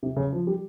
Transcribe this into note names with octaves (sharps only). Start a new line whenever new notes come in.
C3
C#3
F3
G3